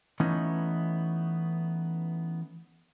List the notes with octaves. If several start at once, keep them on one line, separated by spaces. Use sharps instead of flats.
E3 A3 B3 C#4 D#4